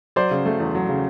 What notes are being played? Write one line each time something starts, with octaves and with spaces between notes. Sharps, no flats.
F#3 C5 D5
C#3
A3
E2
F#3
C#3